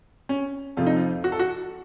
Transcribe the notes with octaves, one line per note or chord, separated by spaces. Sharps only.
C#4
F2 C3 F3 A3 F4
D#4
F4
F#4
A4
F#4